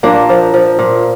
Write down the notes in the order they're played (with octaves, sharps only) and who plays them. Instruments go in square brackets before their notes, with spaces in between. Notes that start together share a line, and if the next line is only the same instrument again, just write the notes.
[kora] A#2 A#3 D4
F3
F3
A#2